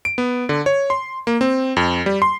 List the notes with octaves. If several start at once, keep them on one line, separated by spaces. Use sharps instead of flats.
D7
B3
D3
C#5
C6
A#3
C4
F2
G3
C6